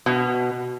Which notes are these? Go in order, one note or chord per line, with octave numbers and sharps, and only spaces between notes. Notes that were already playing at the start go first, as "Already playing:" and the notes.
B2